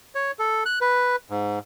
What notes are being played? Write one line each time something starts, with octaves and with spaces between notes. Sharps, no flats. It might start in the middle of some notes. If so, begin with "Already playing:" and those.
C#5
A4
F#6
B4
G#2